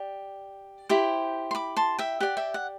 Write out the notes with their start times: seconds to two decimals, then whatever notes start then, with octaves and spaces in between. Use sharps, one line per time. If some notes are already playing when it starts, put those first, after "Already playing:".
Already playing: G4 D5
0.89 E4 G4 C5
1.51 C6
1.55 B5 D6
1.76 A5 C6
1.99 E5 G5
2.20 G4 D5 F#5
2.37 E5 G5
2.54 F#5